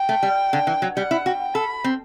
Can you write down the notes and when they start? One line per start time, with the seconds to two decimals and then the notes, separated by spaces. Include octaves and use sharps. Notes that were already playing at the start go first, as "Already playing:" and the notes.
Already playing: G5
0.09 A3
0.23 G3
0.53 D3
0.67 E3
0.82 F#3
0.97 G3 F#5
1.11 E4
1.26 F#4 G5
1.55 A4 B5
1.84 C4